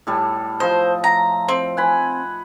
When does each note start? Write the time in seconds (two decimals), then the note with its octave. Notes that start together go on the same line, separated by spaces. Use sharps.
0.07 A2 G3 A4
0.60 F3 C5 D#5
1.04 A#5
1.48 C4
1.77 F#5 G#5 B5